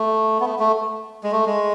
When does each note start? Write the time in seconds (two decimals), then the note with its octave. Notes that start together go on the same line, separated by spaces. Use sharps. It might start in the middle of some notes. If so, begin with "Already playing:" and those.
Already playing: A3
0.41 B3
0.46 A3
0.59 A3
1.24 G#3
1.32 A3
1.46 G#3